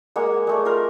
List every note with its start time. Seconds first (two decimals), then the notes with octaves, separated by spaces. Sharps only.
0.16 G#3 A#3 F#5
0.47 G#3 A3 D5
0.65 F4 A#4